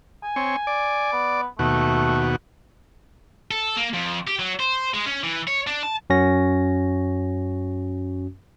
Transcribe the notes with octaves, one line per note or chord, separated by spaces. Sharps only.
G#5
C4 C#5
D5
B3
D#2 B2 A3 F#4
A4
A#3
F2
G4
F#3
C5
G#3
C#4
E3
C#5
D4
A5
F#2 C#4 F#4 A#6